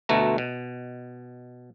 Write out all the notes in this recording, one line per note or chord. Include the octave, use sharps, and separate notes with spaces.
D2 B2 A3 A#5
B2